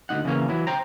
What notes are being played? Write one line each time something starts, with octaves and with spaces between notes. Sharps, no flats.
D2 D#4 F#5
E2 C#3 E3 A#3 C#4
E3 F#3 E4
C5 G5 A#5